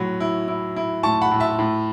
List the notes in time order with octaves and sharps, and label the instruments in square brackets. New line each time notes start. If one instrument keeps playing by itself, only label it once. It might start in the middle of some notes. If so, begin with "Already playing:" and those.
Already playing: [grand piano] A2 F#3 F#5 B5
E4
E4
E4
A2 A5 C#6
F#5 B5
A2
E5 A5
A2